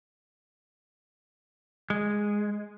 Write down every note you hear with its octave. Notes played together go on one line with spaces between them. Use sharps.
G#3